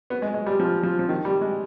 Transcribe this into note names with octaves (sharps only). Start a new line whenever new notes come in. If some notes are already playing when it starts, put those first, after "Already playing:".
B3
G#3
G#3
G3
F3
F3
F3
D#3
G3
G#3